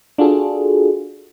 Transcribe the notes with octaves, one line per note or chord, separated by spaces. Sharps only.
D4 F4 F#4 G#4 A4